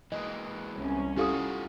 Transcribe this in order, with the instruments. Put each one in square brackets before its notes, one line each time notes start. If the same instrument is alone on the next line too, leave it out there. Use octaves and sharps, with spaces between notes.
[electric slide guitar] E3 G#3 A#3 [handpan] D#5
[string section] C2 C#4
[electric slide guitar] E2 F4 F#5 [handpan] E4 F5 [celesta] G4 A4 D#6